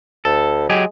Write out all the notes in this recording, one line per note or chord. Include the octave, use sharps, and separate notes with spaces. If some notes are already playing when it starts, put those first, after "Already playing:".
D2 A4
F#3 G#3 G4 G#4